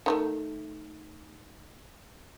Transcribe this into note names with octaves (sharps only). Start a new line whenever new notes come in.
D#3 F3 A3